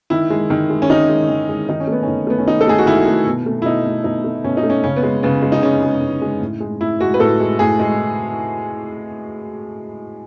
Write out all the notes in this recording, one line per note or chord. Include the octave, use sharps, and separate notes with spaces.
D#3 E4
G#3
D#3
G#3
C#4
D#3 D#4
G#3
D#3
G#3
D#3 D#4
C#4
A3 B3
C#4
D#3
A3 B3
C#4
D#3 D#4
A4
A3 G#4
F#4
D#3 E4
A3
B2
A3
E4
B2 D#4
A3
B2 D#4
A3
B2 C#4
D#4
A3
C#4
C#3 C#4
B3
G#3
C#3 B3
G#3
D#4
C#3 C#4
G#3
C#3
G#3
A2
G#3
A2 E4
G#3 F#4
B4
A2 A4
G#3
A2 G#4
G#3